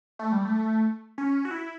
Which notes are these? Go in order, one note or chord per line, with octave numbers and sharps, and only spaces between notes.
A3
G3
A3
C#4
F#4
E4